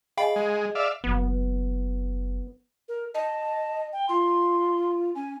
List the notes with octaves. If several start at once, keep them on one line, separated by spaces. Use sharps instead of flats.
G#4 D#5 F5 G5 G#5 B5
G#3
D5 E5 F5
F#1 E3 B3
A#4
D#5 A5
G5
F4 C6
C#4 G#5